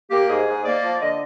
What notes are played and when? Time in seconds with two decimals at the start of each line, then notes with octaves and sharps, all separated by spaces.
0.11 A#3 G4
0.30 G#2 G#4
0.48 G#2
0.65 A#3 D5
0.83 F3
1.01 D3 D#5